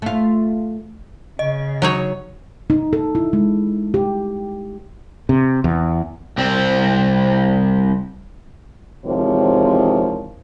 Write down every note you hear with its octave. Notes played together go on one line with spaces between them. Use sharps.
A3 F4
C#3 D#5
F#3 D#4 C#5
D#4
A4
E4
G#3
G4
C3
E2
C2 C4
E2 C3 D#3 F3 G#3 C#5